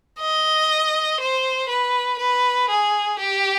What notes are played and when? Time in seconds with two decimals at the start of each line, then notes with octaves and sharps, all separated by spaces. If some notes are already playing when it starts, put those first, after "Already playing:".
0.20 D#5
1.20 C5
1.69 B4
2.19 B4
2.69 G#4
3.19 G4